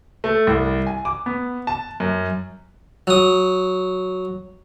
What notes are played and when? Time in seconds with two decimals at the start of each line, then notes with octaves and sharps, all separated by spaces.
0.24 A3
0.47 C2
0.87 G#5
1.05 D6
1.26 B3
1.67 A5
2.00 F#2
3.07 F#3 D#6